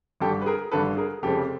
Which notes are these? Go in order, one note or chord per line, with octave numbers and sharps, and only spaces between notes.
G#1 G2 D3 G4 A4
B4
G#4 A#4
G#1 G2 D3 A4 B4
G#4 A#4
F1 F2 C#3 F3 G#3 G4 A4